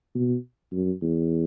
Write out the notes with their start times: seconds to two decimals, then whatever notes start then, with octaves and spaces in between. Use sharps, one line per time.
0.15 B2
0.72 F#2
1.02 E2